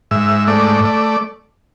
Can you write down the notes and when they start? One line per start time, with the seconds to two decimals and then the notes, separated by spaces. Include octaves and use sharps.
0.11 G#2 E5
0.48 A3 D5
0.85 D5